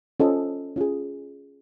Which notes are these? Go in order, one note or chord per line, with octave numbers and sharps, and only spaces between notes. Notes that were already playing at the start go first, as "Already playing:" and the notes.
C#4 F4 A4 C5 D#5
C#4 F4 G#4